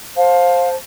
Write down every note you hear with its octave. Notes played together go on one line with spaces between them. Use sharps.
C5 F5 A5